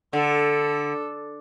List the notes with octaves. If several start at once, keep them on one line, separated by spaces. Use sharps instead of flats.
D3 A4